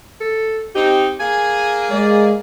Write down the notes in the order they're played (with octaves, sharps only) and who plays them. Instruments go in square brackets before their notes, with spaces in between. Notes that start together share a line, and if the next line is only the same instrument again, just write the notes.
[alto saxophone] A4
[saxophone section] C4 D#4 [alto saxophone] G4
[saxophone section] A#3 G#4 [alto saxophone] G#5
[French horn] G#3 [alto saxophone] D5